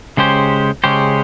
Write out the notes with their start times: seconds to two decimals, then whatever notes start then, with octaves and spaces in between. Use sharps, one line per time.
0.17 C#3 G#3 C#4 G4 C5
0.84 C#3 G#3 C#4 G4 C5